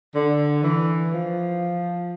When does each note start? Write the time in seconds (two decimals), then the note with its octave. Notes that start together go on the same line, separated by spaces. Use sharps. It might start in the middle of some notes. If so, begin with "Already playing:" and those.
0.14 D3
0.63 E3
1.12 F3